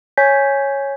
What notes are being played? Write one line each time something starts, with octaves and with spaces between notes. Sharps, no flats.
C#5 G#5 G6 B6